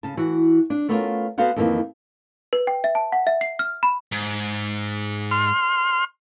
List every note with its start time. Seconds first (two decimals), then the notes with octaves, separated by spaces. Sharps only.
0.03 C#3 A5
0.17 E3 F#4
0.70 D4
0.89 A3 B3 C#4 F4 F#4 A#4
1.38 B3 F#4 A4 C5 F5 F#5
1.56 F2 D#3 E3 G3 A#3
2.53 B4
2.67 G5
2.84 E5
2.95 A5
3.12 F#5
3.27 E5
3.41 C7
3.59 F6
3.83 B5
4.12 G#2
5.31 C6 F6